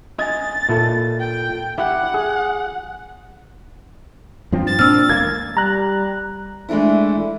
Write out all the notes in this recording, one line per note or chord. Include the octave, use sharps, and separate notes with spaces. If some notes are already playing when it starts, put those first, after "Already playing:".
D#5 G#5 A6
A#2 E4 A4
G5
E4 G4 F#5
G#4
G2 F3 C4
A6
A#2 C4 D4 E6 F6
E1 A#3 G#6
G3 A#5 F#6
E3 G#3 A3 D4 E4